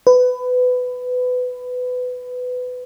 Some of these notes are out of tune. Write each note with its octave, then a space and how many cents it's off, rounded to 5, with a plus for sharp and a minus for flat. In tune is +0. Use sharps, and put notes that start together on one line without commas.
B4 +20